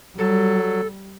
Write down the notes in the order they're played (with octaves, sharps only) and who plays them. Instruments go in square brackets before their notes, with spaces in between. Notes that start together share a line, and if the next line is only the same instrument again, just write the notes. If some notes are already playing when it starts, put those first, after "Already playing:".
[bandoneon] F#3 [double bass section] G3 [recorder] A4